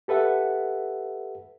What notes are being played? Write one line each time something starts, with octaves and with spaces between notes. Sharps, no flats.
G4 A4 B4 E5 F#5